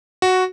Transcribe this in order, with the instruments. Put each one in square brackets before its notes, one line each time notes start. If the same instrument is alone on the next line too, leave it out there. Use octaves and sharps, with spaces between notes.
[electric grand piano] F#4